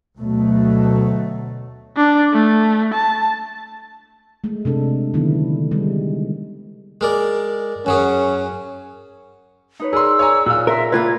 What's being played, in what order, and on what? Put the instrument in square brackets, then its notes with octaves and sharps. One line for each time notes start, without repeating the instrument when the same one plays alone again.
[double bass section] D2 B2 F#3 A3
[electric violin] D4
A3
A5
[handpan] G#3 A3
C3 D4 A4
D3 D#3 F#3 B3 E4
G3 G#3
[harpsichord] G#3 A#4 D5
[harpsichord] F#2 F#3 G#4 [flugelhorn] C#4
[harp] D#4 B4 C#5
[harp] G#4 D5 [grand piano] A#4 C6 [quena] E6
[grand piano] C#5 G#5 A#5
[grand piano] A#2 [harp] F5 F#6
[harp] G#4 A#5 C6 [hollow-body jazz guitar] A#4 [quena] E5
[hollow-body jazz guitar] A#3 F4 B4 [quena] G#6